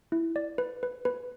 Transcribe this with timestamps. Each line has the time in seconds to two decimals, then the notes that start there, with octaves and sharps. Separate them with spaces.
0.12 E4
0.36 D5
0.58 B4
0.83 B4
1.05 B4